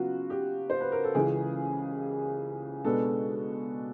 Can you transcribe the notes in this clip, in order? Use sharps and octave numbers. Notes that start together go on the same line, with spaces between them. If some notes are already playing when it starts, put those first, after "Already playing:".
Already playing: C#3 F#3 B3 F4 F#4
G4
C5
B4
A#4
A4
C#2 C#3 E3 G#4
B2 G#3 B3 D4 A4